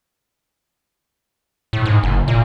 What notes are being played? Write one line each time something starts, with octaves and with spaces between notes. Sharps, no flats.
A2
G#2
F#1
A#2